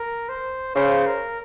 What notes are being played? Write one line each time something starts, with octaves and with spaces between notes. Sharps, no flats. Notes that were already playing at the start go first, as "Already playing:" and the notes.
Already playing: A#4
C5
C#3 C5
A#4